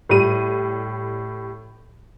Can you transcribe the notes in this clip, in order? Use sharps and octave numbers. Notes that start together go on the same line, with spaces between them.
A2 G3 D#7